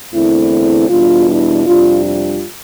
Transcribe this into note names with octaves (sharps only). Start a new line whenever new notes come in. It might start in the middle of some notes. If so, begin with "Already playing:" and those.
E2 D3 A3 C4 E4
E2 B2 G3 D4 F4
E4
F2 C3 G3 D4 F4
F4